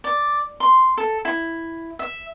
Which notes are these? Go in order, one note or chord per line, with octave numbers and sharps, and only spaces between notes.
D5
C6
A4
E4
E5